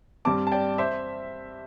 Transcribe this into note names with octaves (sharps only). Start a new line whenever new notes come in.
G2 G3 C4 A5 D6
A5
D5 G5
C5 E5